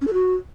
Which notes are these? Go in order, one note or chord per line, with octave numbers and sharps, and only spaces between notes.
C#4
A4
F#4